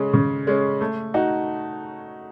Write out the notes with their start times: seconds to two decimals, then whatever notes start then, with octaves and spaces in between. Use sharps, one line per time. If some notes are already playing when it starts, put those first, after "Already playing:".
Already playing: C#3 G#3 C#4
0.14 C#3
0.47 G#3 C#4
0.81 A3
1.14 D#4 F#4